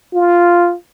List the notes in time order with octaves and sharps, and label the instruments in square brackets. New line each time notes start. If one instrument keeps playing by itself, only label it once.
[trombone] F4